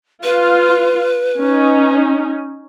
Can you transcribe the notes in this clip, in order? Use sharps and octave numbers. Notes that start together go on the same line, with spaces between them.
F4 B4
C#4 D#4